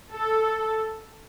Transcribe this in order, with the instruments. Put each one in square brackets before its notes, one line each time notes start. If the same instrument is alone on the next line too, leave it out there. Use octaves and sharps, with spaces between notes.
[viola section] A4